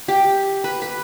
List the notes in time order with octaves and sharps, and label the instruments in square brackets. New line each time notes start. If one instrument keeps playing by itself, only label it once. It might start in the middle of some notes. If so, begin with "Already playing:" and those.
[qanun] G4
B4
B4